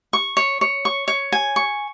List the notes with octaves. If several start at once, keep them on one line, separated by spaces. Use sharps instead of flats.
C#6
C#5
C#5
C#6
C#5
G#5
C#6